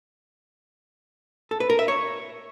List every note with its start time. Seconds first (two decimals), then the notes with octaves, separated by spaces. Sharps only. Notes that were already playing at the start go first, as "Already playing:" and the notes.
1.51 A4
1.60 B4
1.70 A#4
1.79 E5
1.88 C#5